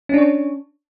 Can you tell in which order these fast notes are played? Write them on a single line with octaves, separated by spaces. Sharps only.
C#4 D4 C#5